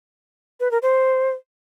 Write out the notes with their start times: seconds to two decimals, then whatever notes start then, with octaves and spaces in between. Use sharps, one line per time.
0.60 B4
0.71 A#4
0.82 C5